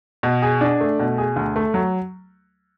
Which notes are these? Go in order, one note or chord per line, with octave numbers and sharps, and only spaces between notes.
B2
G#4
D4
A3
B2
G#4
D2
A3
F#3